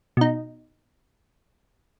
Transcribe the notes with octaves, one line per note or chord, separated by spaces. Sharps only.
B2 D#4